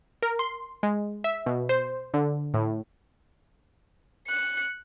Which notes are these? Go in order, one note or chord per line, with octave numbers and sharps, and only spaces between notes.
A#4
C6
G#3
E5
B2
C5
D3
A2
F#6 C#7